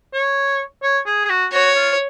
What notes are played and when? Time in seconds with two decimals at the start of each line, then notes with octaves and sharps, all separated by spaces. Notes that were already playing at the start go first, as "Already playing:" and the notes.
0.14 C#5
0.83 C#5
1.06 G#4
1.25 G#4
1.29 F#4
1.53 F#4 C#5
1.76 F4